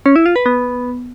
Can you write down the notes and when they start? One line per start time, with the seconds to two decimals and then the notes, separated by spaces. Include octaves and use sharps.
0.06 C#4
0.16 E4
0.26 F4
0.36 B4
0.46 B3